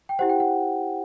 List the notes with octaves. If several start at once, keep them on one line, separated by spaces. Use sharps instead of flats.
G5
E4 G4 C5 F#5
G5
F#5